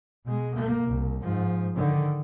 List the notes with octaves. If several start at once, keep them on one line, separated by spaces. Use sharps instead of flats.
B2 G#3
A#3
C2
G#2 F3
D3 D#3